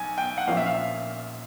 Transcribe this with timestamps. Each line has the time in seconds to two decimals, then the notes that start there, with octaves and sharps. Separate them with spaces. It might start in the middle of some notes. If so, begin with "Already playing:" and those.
Already playing: B1 G#5
0.18 G5
0.38 F#5
0.47 A#1 A#2 F3 A#3 C#4 F5
0.57 E5
0.66 F5